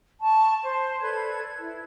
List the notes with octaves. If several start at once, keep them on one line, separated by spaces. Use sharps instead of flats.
A5 C#6
C5
A4 B4 D5 G#6
E4